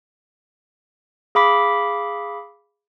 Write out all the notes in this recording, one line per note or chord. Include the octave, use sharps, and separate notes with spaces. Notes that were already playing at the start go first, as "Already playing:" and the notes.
G#4 F5 B5 D6 B6